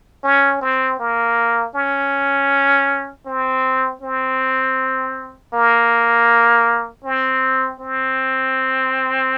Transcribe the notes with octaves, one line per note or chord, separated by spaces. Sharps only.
C#4
C4
A#3
C#4
C4
C4
A#3
C4
C4